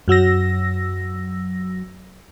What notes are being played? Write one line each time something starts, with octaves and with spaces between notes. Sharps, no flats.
F#2 F#3 E6 A#6